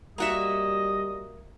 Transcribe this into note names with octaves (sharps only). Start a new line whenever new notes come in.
G3 A#3 F#4 D#5 E5